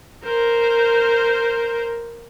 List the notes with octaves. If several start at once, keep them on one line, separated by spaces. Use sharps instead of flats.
A#4 C5